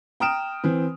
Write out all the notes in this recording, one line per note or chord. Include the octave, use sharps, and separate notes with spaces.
G5 A#5 D#6 F6 D7 E7
E3 C4